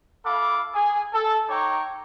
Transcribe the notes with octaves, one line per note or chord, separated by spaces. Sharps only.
E4 A4 F5 B5 D6
G#4 G#5
A4
D#4 C#5 G5 A#5 C#6 D6